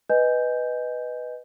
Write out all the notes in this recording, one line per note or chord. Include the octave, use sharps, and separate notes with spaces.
B4 D#5 G#5 G6